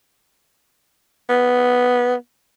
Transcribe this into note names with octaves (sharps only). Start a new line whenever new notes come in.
B3